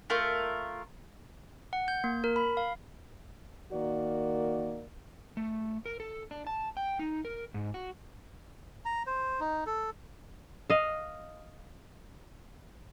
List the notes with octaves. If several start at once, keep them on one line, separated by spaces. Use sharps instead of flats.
A3 F4 A#4
F#5
G6
A#3
A#4
B5
F5
D#3 A#3 F#4 A#4 D5
A3
A#4
A4
D4
A5
G5
D#4
A#4
G#2
F#4
A#5
C5
D#4
A4
D#5 F5